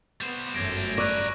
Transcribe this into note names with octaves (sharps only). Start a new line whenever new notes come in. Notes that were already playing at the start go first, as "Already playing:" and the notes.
G3 B3 C5
G1 F#2 A3 G#6 A#6 D7
A#4 B4 D5 C#6 E6 F#6